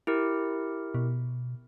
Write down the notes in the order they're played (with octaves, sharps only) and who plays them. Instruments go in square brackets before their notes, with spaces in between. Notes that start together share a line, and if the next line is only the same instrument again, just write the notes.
[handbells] E4 G4 A#4
[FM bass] B2